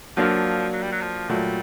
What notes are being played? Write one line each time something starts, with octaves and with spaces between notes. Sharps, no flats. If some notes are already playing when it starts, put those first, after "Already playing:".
F3 F#3 A#3 D4 F4
F#3
G3
F#3
F3
A#2 F#3 G3 A3